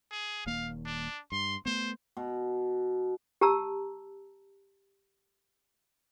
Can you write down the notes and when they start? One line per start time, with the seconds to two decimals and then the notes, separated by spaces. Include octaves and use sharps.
0.11 G#4
0.46 D#1 D#2 A#3 F5
0.85 D4
1.32 G2 C6
1.66 A3 B3 C5
2.17 B2
3.41 G4 A5 A#5 E6